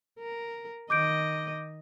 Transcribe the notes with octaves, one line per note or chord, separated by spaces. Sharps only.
A#4
D#3 D#5 D6 G6 D7